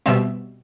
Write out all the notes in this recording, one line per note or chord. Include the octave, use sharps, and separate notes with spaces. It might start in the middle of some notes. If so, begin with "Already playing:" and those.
B2 G3 C4 E5